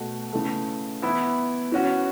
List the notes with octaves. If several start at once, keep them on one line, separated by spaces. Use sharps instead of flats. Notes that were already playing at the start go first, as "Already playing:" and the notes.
Already playing: B2 A3 F#4
C#3 E3 A3
E3 B3 E4
E3 C#4 F#4